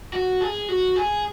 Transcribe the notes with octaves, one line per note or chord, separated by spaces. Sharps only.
F#4
G#4
F#4
G#4